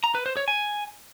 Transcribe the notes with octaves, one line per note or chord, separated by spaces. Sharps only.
A#5
B4
C5
C#5
G#5